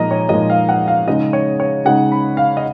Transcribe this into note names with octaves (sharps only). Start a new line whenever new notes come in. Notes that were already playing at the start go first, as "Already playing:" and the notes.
Already playing: A#2 F3 G#3 D#4 D#5 A#5
C#5
A#2 F3 G#3 D#4 D#5
F5
F#5
F5
C#3 G#3 D#4 D#5
C#5
C#5
C#3 G#3 D#4 F#5
B5
F5
D#5